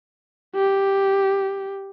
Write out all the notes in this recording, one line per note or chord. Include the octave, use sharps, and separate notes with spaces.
G4